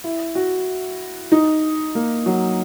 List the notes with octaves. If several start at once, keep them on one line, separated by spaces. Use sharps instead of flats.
E4
F#4
D#4
A#3
F#3